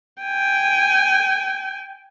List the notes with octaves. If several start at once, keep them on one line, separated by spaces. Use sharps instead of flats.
G5 G#5